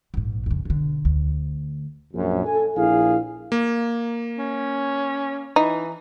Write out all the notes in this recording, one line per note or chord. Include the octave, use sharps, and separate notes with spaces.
A#1 G#2
F2 C#3
B2 D3
D2
A#1 F#2
A4 G#5
A#1 E4 G#4 F5
A#3
C#4
E3 D#4